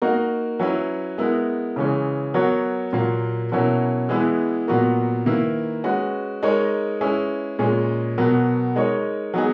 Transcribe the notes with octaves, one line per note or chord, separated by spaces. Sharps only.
A#3 D#4 F#4 A#4
F#3 C#4 E4 B4
G#3 B3 E4 A#4
C#3 E3 G#3 C#4
F#3 B3 F#4 A#4 C#5
A#2 F#3 A#3
B2 F#3 C#4 E4 A#4
E3 G#3 B3 E4 G#4
A#2 F#3 B3 F#4 A#4
D#3 A#3 E4 B4
G#3 C#4 F#4 B4
G#3 D#4 A#4 C#5
G#3 C#4 E4 G#4 B4
A#2 G#3 C#4 G#4
B2 F#3 B3 F#4 A#4
G#3 D#4 A#4 C#5
F#3 B3 D#4 G#4